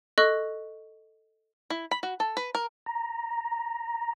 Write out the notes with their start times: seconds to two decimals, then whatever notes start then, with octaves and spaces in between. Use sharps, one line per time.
0.18 A4 D#5 C#6 F#6
1.70 E4
1.91 B5
2.03 F#4
2.20 A4
2.37 B4
2.55 A#4
2.86 A#5